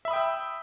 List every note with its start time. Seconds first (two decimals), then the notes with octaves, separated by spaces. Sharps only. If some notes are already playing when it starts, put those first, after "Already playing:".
0.05 E5
0.08 B5
0.11 D#6
0.13 G5
0.16 E6